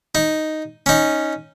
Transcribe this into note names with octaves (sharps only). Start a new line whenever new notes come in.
D#4
C#4 D#4